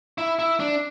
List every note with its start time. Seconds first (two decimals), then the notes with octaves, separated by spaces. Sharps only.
0.18 E4
0.39 E4
0.60 D4